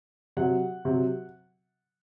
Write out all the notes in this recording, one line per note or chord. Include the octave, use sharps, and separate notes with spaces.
C3 F#3 F#5
C3 F#3